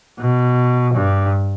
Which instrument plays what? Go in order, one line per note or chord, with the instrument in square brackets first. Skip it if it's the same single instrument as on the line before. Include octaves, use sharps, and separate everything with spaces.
[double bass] B2
G2